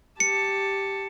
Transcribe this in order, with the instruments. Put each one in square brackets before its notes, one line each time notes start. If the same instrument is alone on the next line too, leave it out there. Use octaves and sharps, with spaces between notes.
[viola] G4 A5 [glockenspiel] C#7